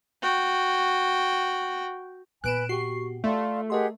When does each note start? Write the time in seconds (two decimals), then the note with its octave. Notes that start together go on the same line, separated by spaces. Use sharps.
0.22 F#4 G5
2.44 A#2 B3 B4 G#5 F#6 D7 E7
2.69 F#4 G4 C#6 C7
3.24 A3 F4 D5 F5 C6
3.70 G4 G#4 A#4 D#5 F#5 C6